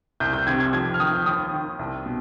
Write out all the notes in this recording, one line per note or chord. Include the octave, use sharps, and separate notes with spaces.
C2 G6
G6
C3 D#3 G#6
G#6
F2 G#6
F6
D#3 D#6
G6
D#2 D#6
D#3
C2
B2